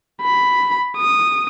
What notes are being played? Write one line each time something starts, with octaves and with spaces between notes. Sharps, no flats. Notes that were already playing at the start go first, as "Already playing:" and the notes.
B5
D#6